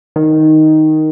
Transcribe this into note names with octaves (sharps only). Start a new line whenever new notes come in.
D#3